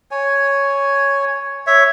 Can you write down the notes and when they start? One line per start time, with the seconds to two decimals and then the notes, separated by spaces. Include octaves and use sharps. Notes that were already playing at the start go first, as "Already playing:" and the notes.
0.11 C#5 G#5
1.67 C#5 E5